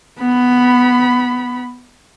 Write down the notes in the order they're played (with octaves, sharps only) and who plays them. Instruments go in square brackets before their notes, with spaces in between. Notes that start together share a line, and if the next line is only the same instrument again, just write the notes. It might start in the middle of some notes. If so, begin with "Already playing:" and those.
[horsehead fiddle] B3 B5